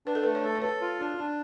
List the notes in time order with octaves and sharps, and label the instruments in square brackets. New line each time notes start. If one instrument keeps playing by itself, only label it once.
[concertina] D4 [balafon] B4
[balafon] A4
[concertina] A3 [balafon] B4
[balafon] C#5
[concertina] A4
[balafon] C#5
[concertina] A4 [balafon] B4
[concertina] F4
D4
D4